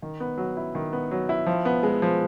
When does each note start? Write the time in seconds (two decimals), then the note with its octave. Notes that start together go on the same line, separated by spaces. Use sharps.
0.02 D#3
0.20 B3
0.38 F#3
0.57 E4
0.75 D#3
0.93 B3
1.11 F#3
1.29 E4
1.46 F3
1.65 B3
1.83 G#3
2.02 F3